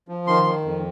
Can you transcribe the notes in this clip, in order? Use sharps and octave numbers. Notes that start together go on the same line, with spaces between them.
F3
D#3 C6
D#3
F2